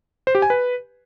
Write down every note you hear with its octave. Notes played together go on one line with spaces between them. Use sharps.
C5
G4
G#5
B4